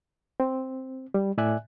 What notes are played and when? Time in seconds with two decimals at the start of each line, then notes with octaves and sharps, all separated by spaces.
0.40 C4
1.14 G3
1.38 A2 D5 E5 G#5 F#6